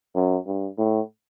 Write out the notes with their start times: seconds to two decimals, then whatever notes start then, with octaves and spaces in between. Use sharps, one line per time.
0.15 F#2
0.46 G2
0.78 A2